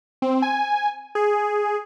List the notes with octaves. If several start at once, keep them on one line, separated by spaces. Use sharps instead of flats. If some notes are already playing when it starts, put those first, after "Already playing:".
C4
G#5
G#4